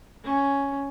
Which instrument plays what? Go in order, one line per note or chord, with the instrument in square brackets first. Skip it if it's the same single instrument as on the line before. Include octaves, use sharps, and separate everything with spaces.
[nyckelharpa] C#4